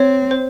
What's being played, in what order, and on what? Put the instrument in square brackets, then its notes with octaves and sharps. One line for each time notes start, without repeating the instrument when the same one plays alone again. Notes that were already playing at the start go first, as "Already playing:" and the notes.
Already playing: [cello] C4 [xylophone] C#5
[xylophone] C5